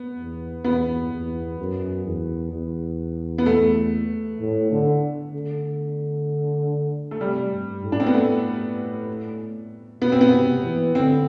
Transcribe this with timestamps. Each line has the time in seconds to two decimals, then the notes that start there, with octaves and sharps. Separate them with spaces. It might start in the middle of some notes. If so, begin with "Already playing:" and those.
Already playing: B3
0.18 E2
0.64 E2 B3
1.12 E2
1.59 F#2
2.06 E2
2.53 E2
3.38 B3
3.46 A3
4.40 A2
4.71 D3
5.33 D3
7.11 A3
7.21 C3 G3
7.52 G2
7.83 A2
7.92 D4
8.00 C4
8.06 B3
8.14 A2 A3
10.01 B2 B3
10.12 C4
10.21 B3
10.33 C3
10.65 E3
10.95 D3 C4